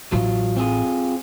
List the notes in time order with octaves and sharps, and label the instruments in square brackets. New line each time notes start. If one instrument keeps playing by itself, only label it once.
[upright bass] A1 E4 [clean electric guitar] F#3 F4
[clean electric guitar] C4 F4 G#4